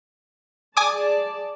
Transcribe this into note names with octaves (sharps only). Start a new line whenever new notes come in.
G#4 D5 G#5 A5 D6 D#6